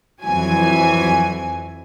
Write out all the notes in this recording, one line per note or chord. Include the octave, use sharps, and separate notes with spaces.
F2 E3 F#3 G#5